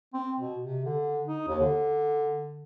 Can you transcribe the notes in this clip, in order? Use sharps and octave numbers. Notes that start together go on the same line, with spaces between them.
C4
B2
C3
D3
D#4
D#2
D3